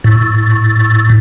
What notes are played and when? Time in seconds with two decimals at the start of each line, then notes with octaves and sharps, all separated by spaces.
0.04 A2